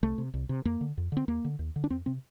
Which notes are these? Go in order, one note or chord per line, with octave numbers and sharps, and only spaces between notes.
C2 A3
C3
C2
C3
F2 A#3
D3
F2
D3 C4
D#2 A#3
D3
D#2
D3
D4
F2 C4
C3 C4